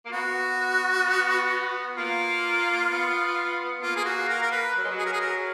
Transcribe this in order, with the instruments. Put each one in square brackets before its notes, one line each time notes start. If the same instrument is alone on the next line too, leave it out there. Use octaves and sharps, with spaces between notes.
[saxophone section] A#3
[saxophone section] B3 [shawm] F#4
[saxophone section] B3
[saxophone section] A#3 [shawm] F4
[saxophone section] B3
[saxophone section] A#3 [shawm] F4
[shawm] G#4
F#4
A#4
A#4
B4
[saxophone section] F#3
G#3
F#3
[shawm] G#4
A#4
G#4
A#4